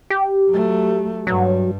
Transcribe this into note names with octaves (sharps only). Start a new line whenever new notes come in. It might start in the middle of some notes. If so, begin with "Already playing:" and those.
G4
F#3 A3
G2 F#3